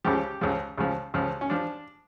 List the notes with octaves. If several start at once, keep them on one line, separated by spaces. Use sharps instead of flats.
C#2 C#3 F3 G4
C#2 C#3 F3
C#2 C#3 F3
C#2 C#3 F3
C#4
F3 D4